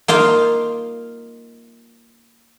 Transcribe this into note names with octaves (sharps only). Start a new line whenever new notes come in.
A#3 D#4 F4 F5